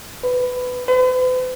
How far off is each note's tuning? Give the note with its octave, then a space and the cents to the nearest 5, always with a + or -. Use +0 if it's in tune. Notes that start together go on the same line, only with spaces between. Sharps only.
B4 +15
B4 +45